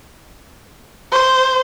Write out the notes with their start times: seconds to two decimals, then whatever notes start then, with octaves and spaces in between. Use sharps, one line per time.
1.12 C5